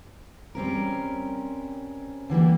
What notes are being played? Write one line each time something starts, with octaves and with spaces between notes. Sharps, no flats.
G3 C4 C#4 A#4
D3 E3 G3 A#3